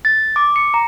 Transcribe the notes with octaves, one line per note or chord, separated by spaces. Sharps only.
A6
D6
C#7
A#5